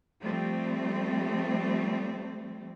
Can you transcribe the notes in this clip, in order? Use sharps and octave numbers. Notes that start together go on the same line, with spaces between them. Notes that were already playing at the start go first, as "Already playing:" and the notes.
F3 G3 A3 C4